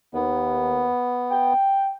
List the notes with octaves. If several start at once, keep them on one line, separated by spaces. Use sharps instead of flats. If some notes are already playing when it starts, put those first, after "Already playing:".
D#2 B3
G5